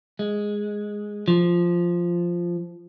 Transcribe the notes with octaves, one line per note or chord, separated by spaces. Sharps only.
G#3
F3